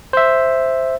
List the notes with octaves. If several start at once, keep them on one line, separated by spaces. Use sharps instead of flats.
C5 E5